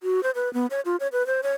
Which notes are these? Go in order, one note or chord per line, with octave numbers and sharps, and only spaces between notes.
F#4
C5
B4
B3
C#5
F4
C#5
B4
C5
C#5